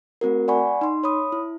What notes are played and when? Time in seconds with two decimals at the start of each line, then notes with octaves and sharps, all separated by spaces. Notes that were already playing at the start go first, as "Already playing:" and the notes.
0.21 A3 C4 F#4 A#4
0.48 D5 F#5 G#5 B5 C#6
0.81 D#4 C6
1.03 C#5 B5 D#6
1.32 E4